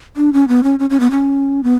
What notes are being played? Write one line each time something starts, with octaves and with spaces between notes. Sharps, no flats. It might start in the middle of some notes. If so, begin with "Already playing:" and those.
D4
C#4
B3
C#4
C#4
C#4
B3
C#4
B3